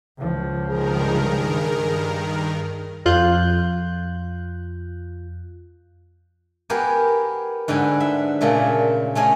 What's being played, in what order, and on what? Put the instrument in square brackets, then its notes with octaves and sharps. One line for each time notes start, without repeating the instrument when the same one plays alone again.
[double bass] C#2 F3
[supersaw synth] G2 D#3 A#4 [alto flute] G#4
[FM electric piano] F2 F4 F#6 G6
[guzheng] B3 G4 G#4 A#4
G#2 D3 B3 G5 G#5
E5
A#2 C#3 A3 E5
A3 C#4 G#4 D#5